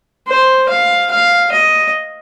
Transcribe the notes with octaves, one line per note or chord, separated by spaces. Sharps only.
C5
F5
F5
D#5